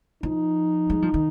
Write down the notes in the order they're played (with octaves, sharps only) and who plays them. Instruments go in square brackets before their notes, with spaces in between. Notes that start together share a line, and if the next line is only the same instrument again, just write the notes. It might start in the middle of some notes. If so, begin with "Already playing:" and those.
[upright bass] F3 [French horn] D#4
[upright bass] G#3
F3
D#3